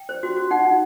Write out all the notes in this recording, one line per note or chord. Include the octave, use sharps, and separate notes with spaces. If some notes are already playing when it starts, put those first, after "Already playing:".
Already playing: G5
C5
F#4
F#4
D#4 F#5
D#4